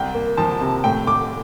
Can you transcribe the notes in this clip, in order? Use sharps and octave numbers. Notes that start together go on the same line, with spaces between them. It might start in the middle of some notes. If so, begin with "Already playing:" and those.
Already playing: C2 G5
A#3
F3 A5
C3
A2 G5
A2 D6